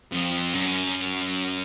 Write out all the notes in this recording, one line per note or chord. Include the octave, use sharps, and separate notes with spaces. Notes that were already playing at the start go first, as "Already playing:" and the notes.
F2
F#2